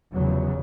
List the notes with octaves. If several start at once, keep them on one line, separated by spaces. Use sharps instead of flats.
F1 E2 C#3 F#3